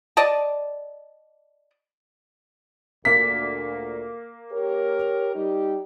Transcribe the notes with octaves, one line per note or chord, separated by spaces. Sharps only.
D5 D#5 A5
D2 A#2 A#3 B6
G4 A#4 C#5
G3 D#4 G4